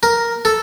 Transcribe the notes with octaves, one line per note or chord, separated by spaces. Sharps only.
A#4
A4